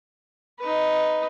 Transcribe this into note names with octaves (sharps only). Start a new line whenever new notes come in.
D#4 B4